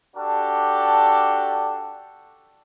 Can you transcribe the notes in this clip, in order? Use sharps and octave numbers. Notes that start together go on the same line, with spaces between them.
D4 F#4 G4 A4